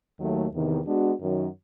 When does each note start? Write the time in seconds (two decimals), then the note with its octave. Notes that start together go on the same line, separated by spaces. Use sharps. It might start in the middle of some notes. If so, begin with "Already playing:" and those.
0.19 D#2 D#3 F#3 A3
0.53 E2 C3 D#3
0.86 G#3 B3 D4 F#4
1.20 F#2 D#3 F#3